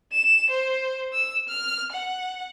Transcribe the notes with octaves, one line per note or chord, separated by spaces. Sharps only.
E7
C5
E6
F6
F#5